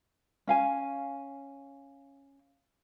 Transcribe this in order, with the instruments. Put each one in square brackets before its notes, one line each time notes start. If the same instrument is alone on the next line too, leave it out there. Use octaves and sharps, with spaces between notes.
[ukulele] C#4 F5 G#5